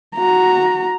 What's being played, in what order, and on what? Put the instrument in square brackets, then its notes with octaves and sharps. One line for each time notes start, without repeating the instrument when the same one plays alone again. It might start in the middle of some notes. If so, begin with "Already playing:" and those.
[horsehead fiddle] F#4 A#5